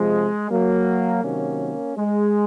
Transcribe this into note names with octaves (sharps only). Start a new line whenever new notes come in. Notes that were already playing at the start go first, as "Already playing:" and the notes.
Already playing: C3 F3 G#3
F#3 A#3
C3 D#3 F#3 A#3 C#4
G#3